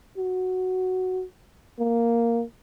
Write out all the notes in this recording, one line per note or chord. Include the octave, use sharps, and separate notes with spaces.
F#4
A#3